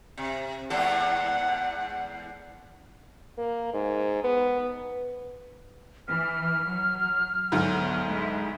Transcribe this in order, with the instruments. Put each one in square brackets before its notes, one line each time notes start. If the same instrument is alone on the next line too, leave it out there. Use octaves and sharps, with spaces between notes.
[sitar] C3
[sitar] E2 G#2 A4 [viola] F#5
[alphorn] A#3
G#2
B3
[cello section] E3 [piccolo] F6
[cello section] F#3
[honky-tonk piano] D2 G#2 [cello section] F#3 B3
[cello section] G#3 E4